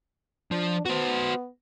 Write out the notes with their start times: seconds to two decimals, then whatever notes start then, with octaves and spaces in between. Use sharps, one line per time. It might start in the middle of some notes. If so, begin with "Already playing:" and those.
0.52 F3 D4
0.85 B3 F#4 C5